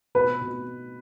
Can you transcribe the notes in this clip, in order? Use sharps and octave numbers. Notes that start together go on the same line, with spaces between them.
B2 B4
B2